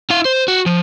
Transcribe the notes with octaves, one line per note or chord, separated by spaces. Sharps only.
E4 F5
C5
F#4
F3